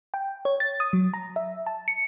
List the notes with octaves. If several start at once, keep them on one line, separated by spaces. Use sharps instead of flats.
G5
C#5
A6
D#6
F#3
A#5
E5
A5
C#7